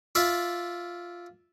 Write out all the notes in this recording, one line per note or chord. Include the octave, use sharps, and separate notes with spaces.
F4 D5 E5